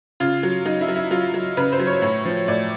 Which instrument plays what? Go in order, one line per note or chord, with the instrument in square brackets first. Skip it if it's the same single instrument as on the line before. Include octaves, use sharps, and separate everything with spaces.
[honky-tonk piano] C#3 F4
F#3
F#3 D#4
E4
F#3
E4
F#3 F4
F#3
C#3 B4
C5
F#3
C#5
A2 C#5
F3
A2 D5